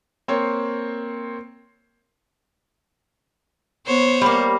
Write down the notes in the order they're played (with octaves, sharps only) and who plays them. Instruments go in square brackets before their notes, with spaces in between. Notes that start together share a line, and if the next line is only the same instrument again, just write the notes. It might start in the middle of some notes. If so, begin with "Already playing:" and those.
[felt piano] A#3 C4 C5 C#5
[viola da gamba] B3 C5 C#5
[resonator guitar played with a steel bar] G3 A#3